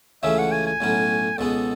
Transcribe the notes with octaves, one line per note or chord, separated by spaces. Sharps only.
C#2 C#3 E3 A3 C#4 E5
F#5
G#5
G#5
B1 A2 F#3 C#4
C#2 B2 G#3 B3 A4